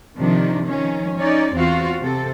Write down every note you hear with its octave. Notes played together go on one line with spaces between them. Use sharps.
C3 D#3 F3 D4
D#3 F3 C#4
C#4 D#4 C#5 D5
E2 C4 F4 F#4 F5
C3 C4 A4